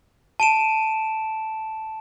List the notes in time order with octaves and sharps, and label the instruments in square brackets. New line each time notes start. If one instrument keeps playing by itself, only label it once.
[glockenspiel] A5 D7 E7